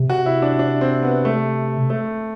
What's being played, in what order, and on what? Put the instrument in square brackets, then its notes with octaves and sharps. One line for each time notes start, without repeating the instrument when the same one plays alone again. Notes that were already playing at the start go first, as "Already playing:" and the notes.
Already playing: [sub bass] C3
[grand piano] F#4
E4
D4
D4
C4
B3
A3
A3